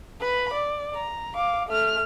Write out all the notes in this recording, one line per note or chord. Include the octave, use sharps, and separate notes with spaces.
B4 B5
D5
A#5
F5 D6
A3 F6